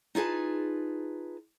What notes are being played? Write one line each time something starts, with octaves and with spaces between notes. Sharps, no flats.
D#4 F4 G#4 B4 A5